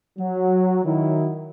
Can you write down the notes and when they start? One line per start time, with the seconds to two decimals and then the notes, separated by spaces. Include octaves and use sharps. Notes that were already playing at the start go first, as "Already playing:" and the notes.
0.19 F#3
0.85 D#3 F#3 E4